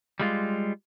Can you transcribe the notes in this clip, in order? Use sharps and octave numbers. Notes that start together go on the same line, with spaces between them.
G3 G#3 F4